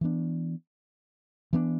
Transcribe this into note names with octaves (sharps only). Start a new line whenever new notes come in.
E3 B3 D4
E3 B3 D4